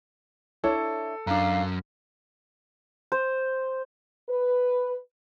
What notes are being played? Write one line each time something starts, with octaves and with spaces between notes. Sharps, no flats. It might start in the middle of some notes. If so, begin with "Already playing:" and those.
D4 E4 A4 C#5
F#2 D4 F5 A#5
C5
B4